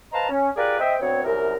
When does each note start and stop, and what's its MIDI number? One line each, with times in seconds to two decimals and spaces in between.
0.12 0.28 71
0.12 0.28 72
0.12 0.28 75
0.12 0.28 77
0.12 0.28 81
0.12 0.28 82
0.29 0.49 61
0.56 0.78 65
0.56 0.78 67
0.56 0.78 68
0.56 0.78 70
0.56 0.78 71
0.56 0.78 74
0.79 0.95 60
0.79 0.95 75
0.79 0.95 76
0.79 0.95 79
0.99 1.23 38
0.99 1.23 59
0.99 1.23 60
0.99 1.23 73
1.24 1.55 36
1.24 1.55 42
1.24 1.55 70